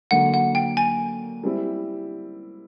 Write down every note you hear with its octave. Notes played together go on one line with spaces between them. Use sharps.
D3 F#3 A#3 F#5
F#5
G5
G#5
G3 C4 E4